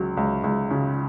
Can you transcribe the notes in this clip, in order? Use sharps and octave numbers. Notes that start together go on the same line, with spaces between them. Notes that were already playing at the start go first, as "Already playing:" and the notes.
Already playing: C#2 F#3
C#2
C#2
C#3